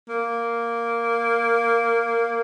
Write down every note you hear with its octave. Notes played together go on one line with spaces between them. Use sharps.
A#3